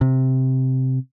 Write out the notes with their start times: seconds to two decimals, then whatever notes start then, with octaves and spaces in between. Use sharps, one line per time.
0.01 C3